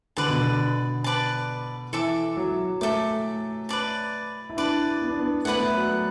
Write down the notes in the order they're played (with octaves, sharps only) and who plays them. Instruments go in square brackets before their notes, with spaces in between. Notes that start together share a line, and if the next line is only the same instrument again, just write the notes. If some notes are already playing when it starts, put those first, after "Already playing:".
[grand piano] D3 [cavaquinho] B4 D5 A5
[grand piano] B2
D3
[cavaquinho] B4 D5 A5
[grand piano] E3 [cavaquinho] A4 E5 D6
[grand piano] F#3
[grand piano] A3 [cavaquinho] A4 E5 D6
[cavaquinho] B4 D5 A5
[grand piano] E4
[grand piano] D4 [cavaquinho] B4 D5 A5
[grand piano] B3
D4
B3
[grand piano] A3 [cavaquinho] E4 B4 D5 F#5
[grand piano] B3
A3
F#3